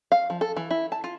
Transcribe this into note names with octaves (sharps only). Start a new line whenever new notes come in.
F5
F3
A4
E3
E4
A5
F4